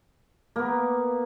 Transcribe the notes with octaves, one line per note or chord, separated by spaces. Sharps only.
A#3 B3